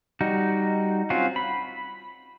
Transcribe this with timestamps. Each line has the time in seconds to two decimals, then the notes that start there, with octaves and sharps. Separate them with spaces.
0.21 G3 D#4 F#4
1.10 C4 C#4 F4 F#4
1.36 B5